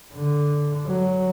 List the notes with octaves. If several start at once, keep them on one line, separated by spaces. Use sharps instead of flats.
D3
F#3